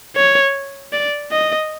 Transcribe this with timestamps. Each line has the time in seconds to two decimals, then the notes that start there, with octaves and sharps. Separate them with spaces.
0.16 C#5
0.93 D5
1.32 D#5